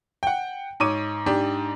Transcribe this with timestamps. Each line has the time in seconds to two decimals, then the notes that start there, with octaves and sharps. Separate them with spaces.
0.23 F#5 G5
0.80 G#2 C#5 D6 D#7
1.26 G#2 D4 G4